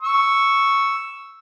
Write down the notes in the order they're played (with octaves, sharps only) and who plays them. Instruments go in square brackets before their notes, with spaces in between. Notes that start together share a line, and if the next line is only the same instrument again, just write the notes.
[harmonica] C#6 E6